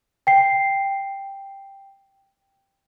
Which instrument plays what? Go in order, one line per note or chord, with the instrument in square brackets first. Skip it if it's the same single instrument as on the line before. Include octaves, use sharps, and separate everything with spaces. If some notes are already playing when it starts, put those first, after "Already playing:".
[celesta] G5 C7